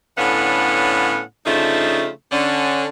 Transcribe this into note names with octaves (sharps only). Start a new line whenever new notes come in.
A2 D3 B3 C#4 F5 F#5
C#3 F3 A3 D4 D#4 F4
D3 C#4